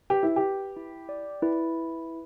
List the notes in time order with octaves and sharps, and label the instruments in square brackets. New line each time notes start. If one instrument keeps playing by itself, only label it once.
[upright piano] G4 [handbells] B4
[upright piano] E4
G4
[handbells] B4
E4
D5
[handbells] E4 [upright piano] B4